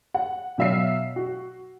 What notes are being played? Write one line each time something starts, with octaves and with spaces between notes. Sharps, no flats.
F#5
B2 F#3 E5 F5 C7
F#4